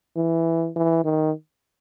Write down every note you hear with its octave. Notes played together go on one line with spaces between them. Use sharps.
E3
E3
D#3